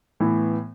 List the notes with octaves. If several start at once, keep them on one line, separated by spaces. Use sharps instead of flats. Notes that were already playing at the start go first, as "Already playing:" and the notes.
A2 E3 B3